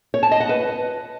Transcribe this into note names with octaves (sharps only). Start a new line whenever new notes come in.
C#5
A5
D#5
F#5
B4